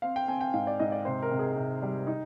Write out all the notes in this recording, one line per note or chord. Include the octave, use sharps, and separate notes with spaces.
C4 F5
G5
C4 G#5
G5
G#2 F5
D5
G#2 D#5
D5
C3 C5
A#4
C3
G#4
C3
G3
D#4